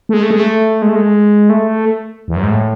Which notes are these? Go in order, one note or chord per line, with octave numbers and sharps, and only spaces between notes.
A3
G#3
A3
G#3
A3
G#3
A3
G#3
A3
E2
F#2
G#2
A2